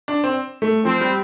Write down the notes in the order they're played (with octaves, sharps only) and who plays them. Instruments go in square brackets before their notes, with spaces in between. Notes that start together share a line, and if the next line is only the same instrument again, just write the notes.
[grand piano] D4
C4
A3
[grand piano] F3 [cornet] C4
[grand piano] G3